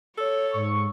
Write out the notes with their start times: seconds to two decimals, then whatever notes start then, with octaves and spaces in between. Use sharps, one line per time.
0.17 A4 C#5
0.54 G#2 C#6